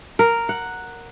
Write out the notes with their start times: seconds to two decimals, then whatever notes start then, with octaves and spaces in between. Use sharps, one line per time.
0.19 A#4
0.49 F#5